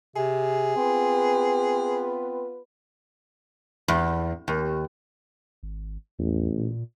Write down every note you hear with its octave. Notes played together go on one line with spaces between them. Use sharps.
C3 G#4
B3 C4 F4 B4
E2
D#2
G#1
A1 E2
A#2